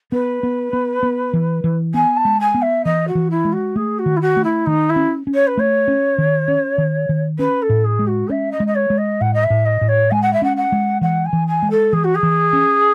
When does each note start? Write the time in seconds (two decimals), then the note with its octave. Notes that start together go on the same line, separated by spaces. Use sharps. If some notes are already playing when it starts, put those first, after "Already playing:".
0.12 B3 B4
0.43 B3
0.73 B3
1.03 B3
1.33 E3
1.64 E3
1.94 B3 G#5
2.16 A5
2.25 G#3
2.40 G#5
2.54 B3
2.62 E5
2.85 E3 D#5
3.07 F#4
3.15 E3
3.30 E4
3.45 G#3
3.52 F#4
3.76 A3 G#4
3.98 F#4
4.06 D#3
4.16 E4
4.21 F#4
4.37 A3
4.44 E4
4.66 D#3 D#4
4.89 E4
4.96 C#4
5.27 C#4
5.34 C#5
5.47 B4
5.57 A3 C#5
5.88 C#4
6.18 D#3
6.48 C#4
6.78 D#3
7.09 D#3
7.38 C#4 B4
7.62 A4
7.69 A2
7.84 G#4
7.99 G#3
8.07 F#4
8.29 C#4 E5
8.52 D#5
8.60 G#3
8.67 D#5
8.75 C#5
8.90 G#3
8.97 D#5
9.21 A2 F#5
9.33 D#5
9.43 E5
9.50 A2
9.65 D#5
9.81 A2
9.88 C#5
10.11 G#3 G#5
10.22 F#5
10.33 E5
10.42 C#4 F#5
10.57 F#5
10.72 G#3
11.01 E3 F#5
11.25 G#5
11.33 E3
11.47 G#5
11.62 G#3
11.70 A4
11.93 E3 G#4
12.04 F#4
12.15 G#4
12.23 E3
12.53 C#4